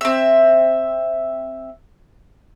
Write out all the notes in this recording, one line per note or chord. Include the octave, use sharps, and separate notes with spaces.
C4 E5